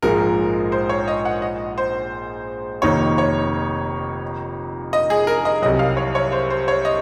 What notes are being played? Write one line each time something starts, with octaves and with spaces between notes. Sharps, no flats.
A#1 G#2 F3 G#3 A#4
C5
C#5
D#5
F#5
D#5
C5
F1 F2 D#3 A#3 D#4 C#5
C#5
D#5
G#4
A#4
D#5
C2 C3 F#3 D#5
F5
C#5
C#5
C5
C5
C#5
D#5